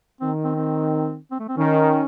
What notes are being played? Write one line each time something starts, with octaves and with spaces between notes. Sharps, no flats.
D#3 C4
C4
C4
C4
A3
C4
D#3 C#4